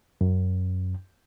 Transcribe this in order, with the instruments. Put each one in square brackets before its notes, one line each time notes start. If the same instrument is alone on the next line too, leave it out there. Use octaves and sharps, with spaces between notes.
[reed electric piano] F#2